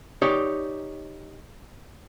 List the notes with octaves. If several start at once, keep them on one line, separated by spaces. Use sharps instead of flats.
D#4 G4 C#5 D5